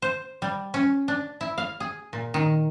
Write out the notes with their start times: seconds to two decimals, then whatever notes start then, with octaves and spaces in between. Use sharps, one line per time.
0.02 C5
0.42 G3
0.74 C#4
1.08 D4
1.41 E4
1.58 F5
1.80 G#4
2.13 A#2
2.34 D#3